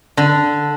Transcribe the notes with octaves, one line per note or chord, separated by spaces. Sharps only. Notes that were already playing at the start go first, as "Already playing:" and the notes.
D3